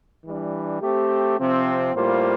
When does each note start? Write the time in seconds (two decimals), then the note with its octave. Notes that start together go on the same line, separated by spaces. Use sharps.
0.25 E3 G3 D4
0.81 A3 C4 G4
1.39 C3 F3 C4
1.95 A2 G3 A#3 F4 C5